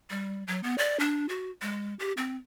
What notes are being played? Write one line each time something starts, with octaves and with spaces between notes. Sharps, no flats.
G3
F#3
B3
D5
D4
F#4
G#3
G4
C4